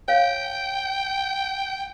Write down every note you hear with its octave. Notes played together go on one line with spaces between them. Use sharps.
C#5 F5 G5